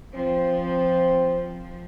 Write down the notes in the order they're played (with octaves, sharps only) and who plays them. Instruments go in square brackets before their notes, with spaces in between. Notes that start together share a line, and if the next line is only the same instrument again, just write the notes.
[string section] F3 [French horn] C4
[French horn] C4
[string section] F3